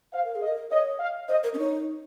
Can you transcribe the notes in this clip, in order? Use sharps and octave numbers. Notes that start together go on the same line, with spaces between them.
C5 F5
A#4
G#4
D#5
A#4
C#5 D#5
F5
C5 D#5
A#4
C#4
D#4 C#5